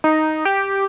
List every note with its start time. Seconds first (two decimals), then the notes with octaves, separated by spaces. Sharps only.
0.04 D#4
0.45 G4